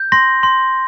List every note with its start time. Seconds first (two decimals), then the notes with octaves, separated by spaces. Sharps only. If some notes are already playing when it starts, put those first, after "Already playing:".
Already playing: G6
0.12 C6 A#6
0.43 C6